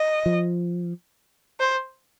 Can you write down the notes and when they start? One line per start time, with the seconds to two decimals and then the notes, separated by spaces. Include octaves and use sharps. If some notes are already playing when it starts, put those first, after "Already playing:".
Already playing: D#5
0.26 F3
1.60 C5